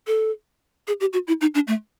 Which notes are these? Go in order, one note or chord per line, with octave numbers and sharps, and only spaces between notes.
A4
G#4
G4
F#4
E4
D#4
D4
A3